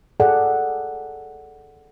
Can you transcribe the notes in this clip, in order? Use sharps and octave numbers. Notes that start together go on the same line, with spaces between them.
G#4 A4 D5 F#5